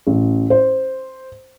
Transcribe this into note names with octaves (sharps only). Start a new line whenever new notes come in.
A1
C5